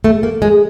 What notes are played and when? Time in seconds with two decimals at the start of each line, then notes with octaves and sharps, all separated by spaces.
0.04 A3
0.23 A#3
0.42 G#3